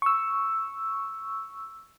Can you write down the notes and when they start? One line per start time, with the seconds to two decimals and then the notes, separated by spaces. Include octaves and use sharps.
0.02 C#6 E6